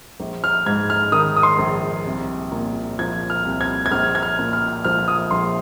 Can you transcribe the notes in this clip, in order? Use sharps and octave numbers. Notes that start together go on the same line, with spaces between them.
A#1
F6
G#2 G#6
F6
D#3 D#6
D#6
C6
A#1
C2
A#2
F3 G#6
F6
C2
G#6
G#6
A#1 F6
G#6
F6
A#2
F6
F3 F6
D#6
A#1 C6